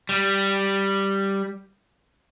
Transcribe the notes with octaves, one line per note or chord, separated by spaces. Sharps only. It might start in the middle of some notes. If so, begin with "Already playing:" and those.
G3